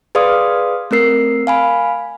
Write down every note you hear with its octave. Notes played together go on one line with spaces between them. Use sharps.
G#4 B4 D5 F5 C6 D#6
A3 C4 A#4 C7
F5 G#5 B5